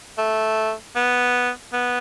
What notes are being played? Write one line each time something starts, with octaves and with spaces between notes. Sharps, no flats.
A3
B3
B3